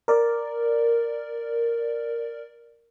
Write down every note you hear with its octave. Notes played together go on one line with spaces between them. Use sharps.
A#4 D5